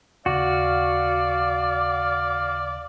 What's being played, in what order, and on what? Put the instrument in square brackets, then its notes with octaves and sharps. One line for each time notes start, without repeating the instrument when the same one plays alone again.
[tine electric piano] D#2 C#3 [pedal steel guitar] F#4 [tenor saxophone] D5 [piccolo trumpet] F5